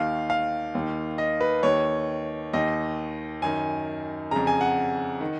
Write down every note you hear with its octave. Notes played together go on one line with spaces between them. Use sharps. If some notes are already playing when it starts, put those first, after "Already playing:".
Already playing: D#2 D#3 F5
F5
D#2 D#3
D#5
B4
D#2 D#3 C#5
D#2 D#3 D#5
F#2 D#3 G#5
F2 C#3 A#5
G#5
F#5
D#3